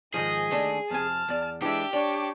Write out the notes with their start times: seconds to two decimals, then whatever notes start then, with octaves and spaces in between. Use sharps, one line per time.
0.14 G#2 D#3 F3 G#4 D#5
0.50 D#2 A3 D4
0.90 F2 C3 G#5 A5 F6
1.28 E2 D5
1.62 E3 G#3 D4 G4 E5
1.93 D4 C#5 D5